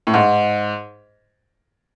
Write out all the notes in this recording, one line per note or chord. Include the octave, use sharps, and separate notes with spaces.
A2
G#2